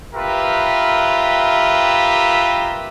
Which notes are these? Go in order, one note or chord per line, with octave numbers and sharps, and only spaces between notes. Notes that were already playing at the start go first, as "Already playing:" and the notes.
F4 G4 A#4 B4 E5